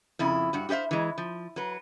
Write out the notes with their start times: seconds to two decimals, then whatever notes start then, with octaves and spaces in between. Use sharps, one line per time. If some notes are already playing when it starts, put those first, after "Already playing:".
0.19 F2 C#3 E4
0.53 G2 F#4
0.69 F#4 G4 C5 E5 F5
0.91 E3 G#3
1.18 F3
1.56 F#3 B4